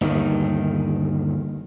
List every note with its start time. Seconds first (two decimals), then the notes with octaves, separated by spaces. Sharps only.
0.01 G1 D#2 D#3